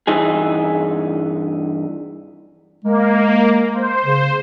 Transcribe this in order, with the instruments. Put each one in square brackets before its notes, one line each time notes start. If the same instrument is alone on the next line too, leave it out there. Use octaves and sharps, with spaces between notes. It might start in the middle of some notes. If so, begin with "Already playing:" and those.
[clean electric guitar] G2 E3 D#4 G#4
[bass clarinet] G#3 [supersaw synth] A#3
[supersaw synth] C5
[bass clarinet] C#3